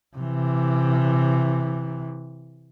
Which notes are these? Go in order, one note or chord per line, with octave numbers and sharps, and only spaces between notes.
C3 E3